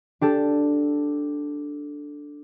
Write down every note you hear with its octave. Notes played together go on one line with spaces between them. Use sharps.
D4 G4 A4